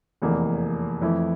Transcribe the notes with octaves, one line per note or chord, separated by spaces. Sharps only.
F1 E2 E3 A#3
F2 E3 A3 E4